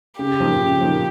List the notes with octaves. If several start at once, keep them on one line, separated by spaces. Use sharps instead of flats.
C#3 G4
F3 A#3 D#4
C#3
F3 A#3 D#4